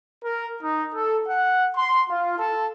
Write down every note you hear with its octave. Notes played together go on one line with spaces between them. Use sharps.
A#4
D#4
A4
F#5
C6
F4
A4